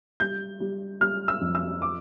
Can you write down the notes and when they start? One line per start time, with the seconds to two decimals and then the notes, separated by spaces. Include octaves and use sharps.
0.20 G3 G6
0.60 G3
1.01 G3 F6
1.28 E6
1.41 F2
1.55 E6
1.82 D6